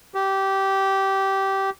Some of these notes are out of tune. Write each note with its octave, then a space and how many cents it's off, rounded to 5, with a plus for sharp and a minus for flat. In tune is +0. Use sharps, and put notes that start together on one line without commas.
G4 -15